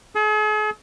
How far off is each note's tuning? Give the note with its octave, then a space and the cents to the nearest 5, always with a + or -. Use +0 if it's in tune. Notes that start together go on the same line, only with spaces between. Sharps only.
G#4 +45